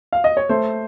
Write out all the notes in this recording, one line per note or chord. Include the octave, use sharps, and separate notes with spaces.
F5
D#5
C#5
A3 C5